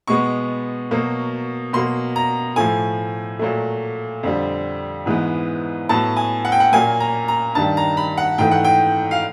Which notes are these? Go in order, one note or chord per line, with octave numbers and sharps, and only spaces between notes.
B2 G#3 B3 C#6
B2 F#3 A#3
B2 F#3 A#3 C6
A#5
A2 F3 A3 G#5
A#2 F#3 A3
F2 D3 G3
G#2 E3 G#3 B3
A2 F#3 B3 A5
G#5
F#5
G5
F#5
A#2 F#3 A#3 G#5
A#5
A#5
G2 D#3 G3 A5
A#5
B5
F#5
G#2 E3 A3 G5
F#5
G5
F5